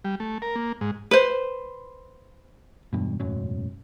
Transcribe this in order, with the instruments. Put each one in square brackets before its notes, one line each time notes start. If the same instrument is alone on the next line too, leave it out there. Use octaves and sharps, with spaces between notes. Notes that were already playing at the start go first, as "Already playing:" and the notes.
[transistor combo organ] G3
A3
A#4
A#3
G#2
[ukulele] B4 C5
[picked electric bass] E1 G2 B2
E1 A1 F#2 F#3